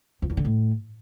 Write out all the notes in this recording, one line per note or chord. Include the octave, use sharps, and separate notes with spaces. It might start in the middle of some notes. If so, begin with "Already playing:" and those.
F2
E2
D3
A2